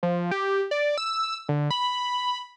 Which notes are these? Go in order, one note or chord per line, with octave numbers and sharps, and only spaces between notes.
F3
G4
D5
E6
D3
B5